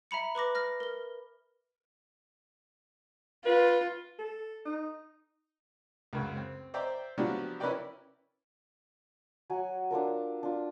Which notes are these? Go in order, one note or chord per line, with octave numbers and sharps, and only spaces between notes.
E5 A#5 B5 C#7
B4 B5 D6 A#6
F6 A#6
A#4 G7
F4 B4
A4
D#4
C#2 F#2
C4
C5 D5 E5 G5 A#5
F3 F#3 B3 D4 F4 G4
C#4 E4 A#4 B4 D5 G5
F#3 F#5 G#5
D4 F4 A4 A#4
D4 F4